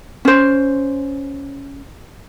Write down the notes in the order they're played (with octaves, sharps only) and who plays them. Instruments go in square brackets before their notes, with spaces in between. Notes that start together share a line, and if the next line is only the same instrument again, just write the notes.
[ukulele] C#4 C5